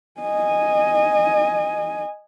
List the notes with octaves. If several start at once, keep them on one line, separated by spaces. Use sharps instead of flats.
D#5 G#5